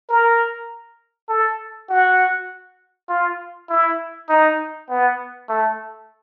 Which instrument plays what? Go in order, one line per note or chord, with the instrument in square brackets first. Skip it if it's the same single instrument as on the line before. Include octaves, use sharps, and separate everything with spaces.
[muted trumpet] A#4
A4
F#4
F4
E4
D#4
B3
A3